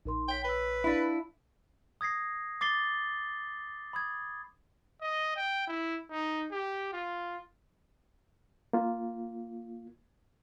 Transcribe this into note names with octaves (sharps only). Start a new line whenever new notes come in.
A#1 D#4 A#4 C6
C#5 G5 B6
B4 C#5 E6
D4 E4 F5
D#6 G#6 A#6 C7
D6 A6 C7 G7
B5 D#6 G#6
D#5
G5
E4
D#4
G4
F4
A#3 F4